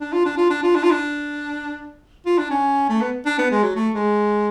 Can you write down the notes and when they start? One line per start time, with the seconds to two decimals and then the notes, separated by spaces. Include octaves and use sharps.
0.01 D4
0.13 F4
0.26 D4
0.38 F4
0.50 D4
0.63 F4
0.76 D4
0.84 F4
0.91 D4
2.26 F4
2.38 D4
2.51 C#4
2.89 A3
3.01 B3
3.26 D4
3.39 B3
3.51 G#3
3.63 F#3
3.76 A3
3.94 G#3